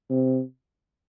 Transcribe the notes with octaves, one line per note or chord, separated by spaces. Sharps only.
C3